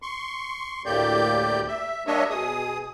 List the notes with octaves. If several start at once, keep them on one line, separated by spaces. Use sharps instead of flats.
C6 C#6
D2 A2 A#3 G4 D5 G6
E5
G3 A#3 D4 C#5 D#5 E5
B2 G#4 D#6